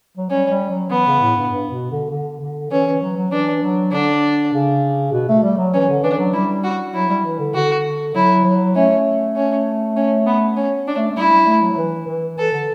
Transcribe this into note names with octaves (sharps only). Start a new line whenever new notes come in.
F#3
G3 C#4
G3
F#3
E3 B3
C#3
A2
G2
G2
B2
D3
D3
D3
E3 C#4
E3
F#3
F#3
E3 D4
F#3
D3 D4
C#3
B2
A3
G3
F#3
E3 C#4
D3
E3 D4
F#3
G3 E4
F#4
F#3 E4
G3
E3
D3
D3 F#4
F#3 E4
F#3
A3 C#4
C#4
C#4
B3
C#4
D4
A3
A3
G3 E4
G3
A3
F#3
F#3
E3
E3
E3 A4
D3